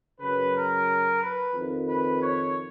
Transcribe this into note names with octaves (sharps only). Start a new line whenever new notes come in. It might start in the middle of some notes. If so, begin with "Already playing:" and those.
F#2 C#3 B4
A#4
B4
F2 D#3
B4
C#5